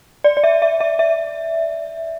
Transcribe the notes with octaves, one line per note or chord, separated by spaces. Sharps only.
D5
D5
E5
E5
E5
E5